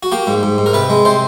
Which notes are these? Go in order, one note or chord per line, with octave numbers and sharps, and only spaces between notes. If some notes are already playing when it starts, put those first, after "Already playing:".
F#4
A#3 G4
G#2
G#2
G#2
A#4
C3 B4
G#3
C3 C5